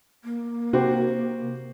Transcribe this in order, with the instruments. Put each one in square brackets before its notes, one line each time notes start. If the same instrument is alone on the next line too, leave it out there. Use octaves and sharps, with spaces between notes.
[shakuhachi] A#3
[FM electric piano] C3 [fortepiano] F#4 G4 C5